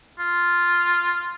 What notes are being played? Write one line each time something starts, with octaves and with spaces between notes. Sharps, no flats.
F4